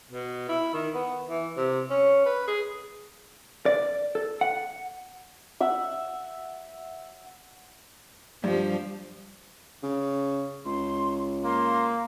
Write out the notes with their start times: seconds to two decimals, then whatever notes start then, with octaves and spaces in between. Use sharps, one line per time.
0.10 B2
0.49 E4
0.74 D#3
0.94 B3
1.29 E3
1.57 C3
1.90 C#4
2.26 B4
2.47 G#4
3.66 D5
4.15 A4
4.41 F#5
5.61 E5 F#5
8.44 G2 F3 G3
9.83 C#3
10.66 C#2 C6
11.45 A#3 C6